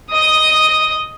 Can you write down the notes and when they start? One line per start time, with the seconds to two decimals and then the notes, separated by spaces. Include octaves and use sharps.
0.11 D#5 D#6